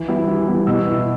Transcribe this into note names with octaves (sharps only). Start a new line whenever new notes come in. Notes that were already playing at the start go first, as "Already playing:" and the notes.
Already playing: E3
G3 B3 E4
E3
G3 B3 E4
B2 E6
B3 E4